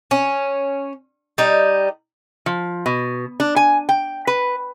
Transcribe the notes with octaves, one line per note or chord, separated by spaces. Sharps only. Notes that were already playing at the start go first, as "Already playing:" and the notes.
C#4
G3 D#4
F3
B2
D4
G#5
G5
B4